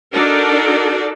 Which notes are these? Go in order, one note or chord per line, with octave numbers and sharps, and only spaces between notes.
D4 D#4 F#4 A4 A#4 D5